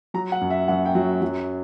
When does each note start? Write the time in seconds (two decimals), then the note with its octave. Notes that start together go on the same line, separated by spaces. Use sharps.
0.14 F#3 A#5
0.32 F#5
0.41 F#2
0.50 E5
0.68 F#2 F#5
0.86 G5
0.95 F#3
1.22 F#3